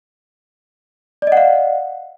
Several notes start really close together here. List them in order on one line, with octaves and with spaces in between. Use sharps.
D5 D#5 F#5 F5